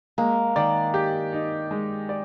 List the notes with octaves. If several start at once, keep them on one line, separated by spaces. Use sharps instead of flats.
G#3 A#3
D#3 D5
G4
D#4
G#3
D5